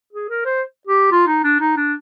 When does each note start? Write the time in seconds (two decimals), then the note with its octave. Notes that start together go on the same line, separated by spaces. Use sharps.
0.13 G#4
0.29 A#4
0.45 C5
0.87 G4
1.11 F4
1.27 D#4
1.44 D4
1.60 D#4
1.77 D4